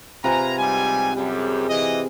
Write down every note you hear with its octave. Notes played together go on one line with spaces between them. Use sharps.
C3 F4 B4 G#5 A#5
G#2 G3 G#5
F#2 G3 G#4
E3 D#5